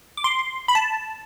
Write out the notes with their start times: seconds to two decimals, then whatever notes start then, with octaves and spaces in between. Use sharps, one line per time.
0.17 D6
0.24 C6
0.68 B5
0.75 A5